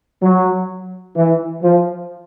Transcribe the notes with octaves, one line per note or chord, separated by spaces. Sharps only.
F#3
E3
F3